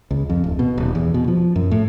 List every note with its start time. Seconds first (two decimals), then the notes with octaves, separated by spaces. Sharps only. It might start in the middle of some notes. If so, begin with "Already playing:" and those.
0.11 C#2
0.30 F2
0.44 D1
0.59 B2
0.78 D#1
0.95 E2
1.14 B2
1.28 F3
1.56 F#2
1.71 A2